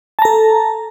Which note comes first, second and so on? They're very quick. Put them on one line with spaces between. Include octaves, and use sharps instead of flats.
A5 A#5 A4